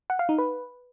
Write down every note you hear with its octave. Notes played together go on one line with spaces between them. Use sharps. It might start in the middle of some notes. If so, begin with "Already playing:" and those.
F#5
F5
D#4
B4